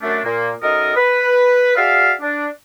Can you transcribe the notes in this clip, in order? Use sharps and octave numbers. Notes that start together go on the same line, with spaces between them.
F#2 A3 D4
A#2 A#3
F#2 D#4 A4 A#4 D#5 D#6
B4
F#4 G#4 D5 E5 F5
D4